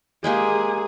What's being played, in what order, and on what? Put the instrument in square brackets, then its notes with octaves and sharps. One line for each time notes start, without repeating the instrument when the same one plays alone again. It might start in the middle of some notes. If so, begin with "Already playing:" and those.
[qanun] G#3 A#3 G4 [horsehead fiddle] G#4